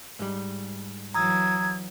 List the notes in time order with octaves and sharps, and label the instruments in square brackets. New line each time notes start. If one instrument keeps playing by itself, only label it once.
[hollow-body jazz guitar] G#2 G3
[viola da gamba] E3 F#3 [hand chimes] A#5 D#6 E6 [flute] G#6